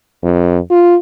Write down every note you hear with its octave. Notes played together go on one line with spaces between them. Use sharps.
F2
F4